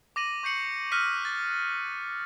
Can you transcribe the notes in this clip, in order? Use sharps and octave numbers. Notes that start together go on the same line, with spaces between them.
D6 A#6 D#7 F#7
C#6 G6 C7 C#7 F#7
D#6 F6 F#6 A#6 B6 D#7
A6